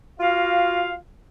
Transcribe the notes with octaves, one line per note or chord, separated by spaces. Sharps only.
F4 F#4 F5